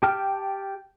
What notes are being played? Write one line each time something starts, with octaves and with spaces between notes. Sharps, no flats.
G4 G5 A5 F6